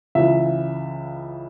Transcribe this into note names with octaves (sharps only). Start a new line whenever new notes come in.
C#2 C#3 E3 E5